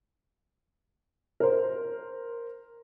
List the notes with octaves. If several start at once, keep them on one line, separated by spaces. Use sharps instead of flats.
A#4 C5